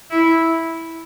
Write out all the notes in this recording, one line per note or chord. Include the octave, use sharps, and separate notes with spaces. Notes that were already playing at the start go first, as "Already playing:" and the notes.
E4